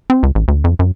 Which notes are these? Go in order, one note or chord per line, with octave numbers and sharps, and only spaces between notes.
C4
C#2
A1
D2
F2
F#2